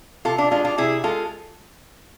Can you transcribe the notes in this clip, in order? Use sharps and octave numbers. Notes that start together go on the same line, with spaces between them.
C3 F4 A4
D4 F4
G#3 D4 F4
D4 F4
C3 E4 G#4
G#3 F4 A4